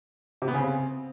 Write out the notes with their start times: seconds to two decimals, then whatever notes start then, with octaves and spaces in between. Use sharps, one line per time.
0.42 C3
0.48 B3
0.54 C#3
0.60 C4